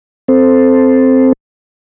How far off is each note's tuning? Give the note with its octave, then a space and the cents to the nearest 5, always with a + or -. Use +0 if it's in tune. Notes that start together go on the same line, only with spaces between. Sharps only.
C4 +0 A4 +0 C5 +0